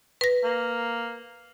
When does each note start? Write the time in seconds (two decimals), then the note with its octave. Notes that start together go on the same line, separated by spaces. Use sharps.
0.21 B4 A#6
0.44 A#3